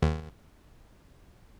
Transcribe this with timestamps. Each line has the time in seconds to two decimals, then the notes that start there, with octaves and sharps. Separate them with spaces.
0.02 D#2